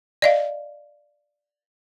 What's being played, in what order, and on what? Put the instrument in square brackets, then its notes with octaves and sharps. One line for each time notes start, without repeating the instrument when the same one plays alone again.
[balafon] D5 D#5 F5